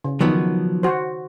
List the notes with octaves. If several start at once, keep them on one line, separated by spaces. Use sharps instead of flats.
C#3
D#3 F3 F#3 B3
F#4 C5